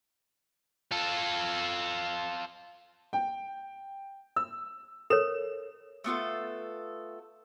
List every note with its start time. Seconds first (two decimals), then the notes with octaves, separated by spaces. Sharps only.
0.91 F4 A4
3.13 G5
4.36 E6
5.10 A4 A#4 C#5 E7
6.04 A3 B3 F4 A4